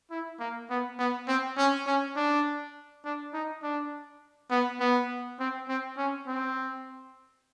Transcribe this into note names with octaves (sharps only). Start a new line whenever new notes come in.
E4
A#3
B3
B3
C4
C#4
C#4
D4
D4
D#4
D4
B3
B3
C4
C4
C#4
C4